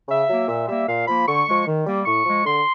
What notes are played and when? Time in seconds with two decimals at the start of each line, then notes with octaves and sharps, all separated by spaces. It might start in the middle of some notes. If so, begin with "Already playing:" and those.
0.08 C#3 E5
0.29 F#3 A#3
0.48 A#2 E5
0.68 G3 A#3 E5
0.87 A#2 F5
1.07 F3 A#3 B5
1.27 D3 C#6
1.46 F3 G#3
1.66 D#3
1.86 G3 A#3
2.05 A2 C#6
2.25 F3 G#3
2.45 D3 C6